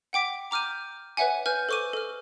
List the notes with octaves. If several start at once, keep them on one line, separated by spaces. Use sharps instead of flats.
F#5 G5 D6 B6
A#5 D6 F6 G6 D#7
B4 C#5 E5 F#5 G#5
B4 G#5 F6 G6
A4 C5 C#6 D6 D#7
A4 F6